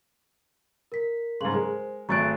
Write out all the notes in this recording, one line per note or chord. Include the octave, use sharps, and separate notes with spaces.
A#4 B6
G#2 C#3 C6 F#7
G#3 A#4 C5
G#1 A3 C#6 F#6 A6 D7